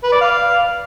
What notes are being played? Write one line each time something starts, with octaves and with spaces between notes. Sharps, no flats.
B4
D5
F5